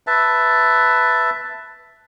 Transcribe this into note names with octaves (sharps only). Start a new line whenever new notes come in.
B4 E5 A5